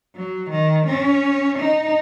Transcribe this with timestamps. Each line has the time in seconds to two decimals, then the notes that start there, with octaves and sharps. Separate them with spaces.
0.16 F#3
0.51 D#3
0.87 C#4
1.59 D#4